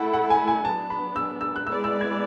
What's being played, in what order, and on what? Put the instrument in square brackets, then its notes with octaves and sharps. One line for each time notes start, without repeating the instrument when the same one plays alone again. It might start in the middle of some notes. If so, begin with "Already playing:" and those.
Already playing: [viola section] A3 E4 A4 [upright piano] F#5
[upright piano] F#5
G#5
G#5
[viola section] F#3 B3 D4 [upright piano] A5
[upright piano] B5
E6
E6
F#6
[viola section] G#3 B3 E4 G#4 D5 [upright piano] E6
[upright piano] E6
G#6